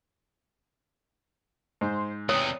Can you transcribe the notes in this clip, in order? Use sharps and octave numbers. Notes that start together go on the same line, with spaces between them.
G#2 C5
E2 C3 C#5 D#6